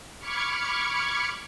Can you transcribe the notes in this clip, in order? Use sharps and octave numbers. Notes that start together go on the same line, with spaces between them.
B5 C#6 D6 F6 G#6 C#7